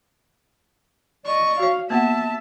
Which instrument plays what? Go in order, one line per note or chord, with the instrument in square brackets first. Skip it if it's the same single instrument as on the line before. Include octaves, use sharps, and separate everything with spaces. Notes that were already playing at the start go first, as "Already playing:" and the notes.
[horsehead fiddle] D5 D#5 [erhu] C#6
[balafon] F#4 C#5 [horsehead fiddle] F5
[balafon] A#3 B3 F#5 [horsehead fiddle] E5 [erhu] A5